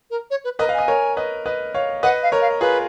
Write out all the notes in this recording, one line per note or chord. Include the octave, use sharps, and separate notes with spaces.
A#4
C#5
B4
A#4 B4 D#5
F5
D#5 G#5
A#4 C#5
B4 D#5
B4 D#5
C#5 F5
B4 D#5 F#5
F5
A#4 C#5
F5
F4 G#4 B4